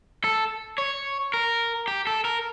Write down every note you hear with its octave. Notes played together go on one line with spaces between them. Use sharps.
A4
C#5
A#4
G4
A4
A#4